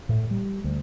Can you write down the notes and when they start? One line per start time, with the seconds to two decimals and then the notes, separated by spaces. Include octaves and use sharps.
0.09 A2
0.31 G3
0.64 D2